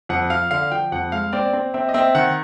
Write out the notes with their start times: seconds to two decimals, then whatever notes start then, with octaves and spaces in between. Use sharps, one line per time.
0.09 F2 F#5
0.30 F3 F5
0.51 D3 F5
0.71 F3 G5
0.92 F2 F#5
1.12 G#3 F5
1.33 C4 D5
1.53 C4
1.74 C4 E5
1.89 D#5
1.94 C4 E5
2.15 D#3 F#5